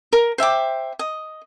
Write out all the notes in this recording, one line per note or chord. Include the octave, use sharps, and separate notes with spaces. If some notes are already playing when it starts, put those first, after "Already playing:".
A#4
C5 E5 G5 D6
D#5